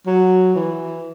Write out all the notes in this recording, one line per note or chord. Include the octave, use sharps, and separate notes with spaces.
F#3
E3